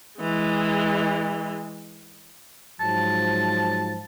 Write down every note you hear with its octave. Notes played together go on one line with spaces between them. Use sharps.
E3 G#3
G#2 F3 F#3 A5